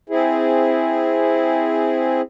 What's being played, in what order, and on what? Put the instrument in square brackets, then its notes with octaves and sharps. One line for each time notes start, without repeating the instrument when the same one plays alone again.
[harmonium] C4 E4 G#4